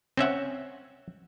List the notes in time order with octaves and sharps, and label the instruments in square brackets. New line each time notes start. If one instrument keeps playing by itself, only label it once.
[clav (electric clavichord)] C4 C#4 E5 F#5